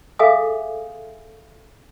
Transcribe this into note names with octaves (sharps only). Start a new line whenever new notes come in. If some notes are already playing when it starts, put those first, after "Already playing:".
G#4 A4 E5 F5 G#5 D#6